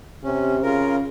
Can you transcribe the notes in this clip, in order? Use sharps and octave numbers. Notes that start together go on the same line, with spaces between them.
C3 C#4
C#3 F4 A#4